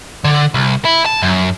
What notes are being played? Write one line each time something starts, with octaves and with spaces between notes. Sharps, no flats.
D3
C2
E4
A5
F#2